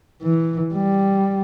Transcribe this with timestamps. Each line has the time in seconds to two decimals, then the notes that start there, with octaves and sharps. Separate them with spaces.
0.22 E3
0.74 G3